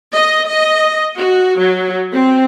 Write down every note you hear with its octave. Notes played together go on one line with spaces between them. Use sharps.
D#5
D#5
F#4
F#3
C4